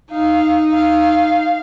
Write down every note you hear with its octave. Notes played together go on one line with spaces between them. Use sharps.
D#4 F5
F5